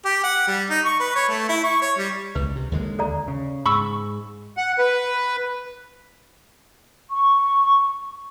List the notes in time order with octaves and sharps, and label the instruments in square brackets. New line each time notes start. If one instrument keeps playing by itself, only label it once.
[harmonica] G4
F#5
G3
D#4
C#6
B4
C#5
A3
E4
C#6
C#5
G3
[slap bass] C#2 [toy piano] B4
[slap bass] C3
D#2 D3 G#3
[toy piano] A4 D5 A#5
[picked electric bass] C#3
[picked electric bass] G#2 [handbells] B5 C#6 E6
[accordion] F#5
B4
[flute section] C#6